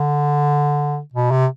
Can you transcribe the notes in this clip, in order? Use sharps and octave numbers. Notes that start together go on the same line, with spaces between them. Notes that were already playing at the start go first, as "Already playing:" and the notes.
Already playing: D3
B2
C3